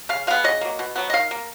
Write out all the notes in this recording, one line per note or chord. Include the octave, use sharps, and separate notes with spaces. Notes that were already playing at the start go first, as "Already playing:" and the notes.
C#3 F5
G#3 B3 F5
C#3 D#5
F#3 A#3
B2
F#3 B3
D#5
D#3 F5
A#3